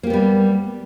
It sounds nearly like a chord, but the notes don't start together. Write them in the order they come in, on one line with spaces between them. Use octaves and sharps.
A#3 G4 B3 G3